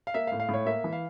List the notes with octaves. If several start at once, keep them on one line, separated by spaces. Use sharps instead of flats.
F5
A#3 E5
F5
A2
F5
A2 C#5
A#3 E5
E3
F5